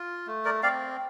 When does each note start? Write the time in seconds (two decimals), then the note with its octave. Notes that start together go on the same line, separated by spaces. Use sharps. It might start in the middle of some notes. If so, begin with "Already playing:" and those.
Already playing: F4
0.27 A3
0.45 A#4 D5
0.63 C4 D5 F5